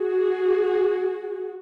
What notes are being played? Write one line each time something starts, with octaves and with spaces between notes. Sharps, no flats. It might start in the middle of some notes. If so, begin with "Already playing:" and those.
Already playing: F#4 G#4